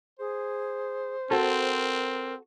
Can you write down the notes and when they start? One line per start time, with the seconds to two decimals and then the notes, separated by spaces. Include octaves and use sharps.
0.19 G#4 C5
1.31 C4 F#4 A4 A#4